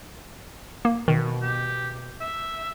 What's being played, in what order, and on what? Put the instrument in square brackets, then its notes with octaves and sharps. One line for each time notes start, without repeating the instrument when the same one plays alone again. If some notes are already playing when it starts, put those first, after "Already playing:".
[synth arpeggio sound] A#3
[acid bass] B2 [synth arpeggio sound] D#3
[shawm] G4
E5